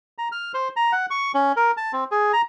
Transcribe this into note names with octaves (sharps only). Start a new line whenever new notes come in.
A#5
F6
C5
A#5
F#5
C#6
C#4
A#4
A5
C4
G#4
A#5